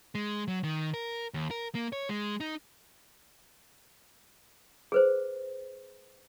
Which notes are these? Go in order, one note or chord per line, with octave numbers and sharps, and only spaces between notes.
G#3
F#3
D#3
A#4
D#2
A#4
A#3
C#5
G#3
D#4
G#4 B4 C5